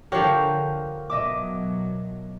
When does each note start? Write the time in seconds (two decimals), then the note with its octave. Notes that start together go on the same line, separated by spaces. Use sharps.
0.12 D3 F3 G4 A#4 C#5 F#5
1.10 B2 F#3 D#5 E5 D6